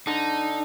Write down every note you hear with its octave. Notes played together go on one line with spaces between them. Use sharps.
D3 D#4